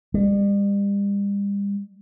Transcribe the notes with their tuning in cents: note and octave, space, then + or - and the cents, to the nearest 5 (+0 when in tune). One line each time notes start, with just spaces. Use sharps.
G3 +40